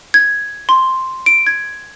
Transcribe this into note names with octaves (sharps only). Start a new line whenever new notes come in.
G#6
C6
D7
G#6